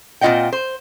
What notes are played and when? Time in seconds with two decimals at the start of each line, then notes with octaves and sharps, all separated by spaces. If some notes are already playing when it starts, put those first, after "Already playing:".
0.21 A#2 C4 F4 D#5 F#5 G5
0.53 C5